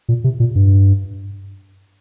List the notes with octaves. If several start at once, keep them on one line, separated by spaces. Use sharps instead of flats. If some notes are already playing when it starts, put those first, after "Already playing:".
A#2
C3
A#2
G2